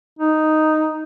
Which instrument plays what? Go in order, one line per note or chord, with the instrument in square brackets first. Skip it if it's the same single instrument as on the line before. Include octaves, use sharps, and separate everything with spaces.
[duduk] D#4